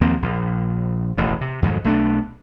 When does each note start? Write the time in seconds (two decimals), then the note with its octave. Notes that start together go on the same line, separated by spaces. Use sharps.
0.01 D#2 F3 A#3 C4
0.22 A#1
1.18 E1 A1 A2
1.41 C3
1.62 F2 G#2 D#3 F#3
1.84 B1 A3 B3 D4